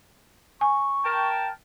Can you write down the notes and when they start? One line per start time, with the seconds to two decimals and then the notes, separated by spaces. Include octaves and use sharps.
0.61 G#5 C#6
1.05 A#4 G5 A5